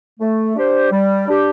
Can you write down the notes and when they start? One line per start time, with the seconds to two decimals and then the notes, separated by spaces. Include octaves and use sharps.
0.20 A3
0.56 D4 G4 C5
0.91 G3
1.27 D4 G4